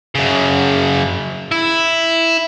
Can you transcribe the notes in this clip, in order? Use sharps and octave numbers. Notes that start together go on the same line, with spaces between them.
F#2 C#3
E4